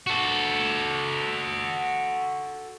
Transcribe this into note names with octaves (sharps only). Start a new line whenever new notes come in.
F#4 A4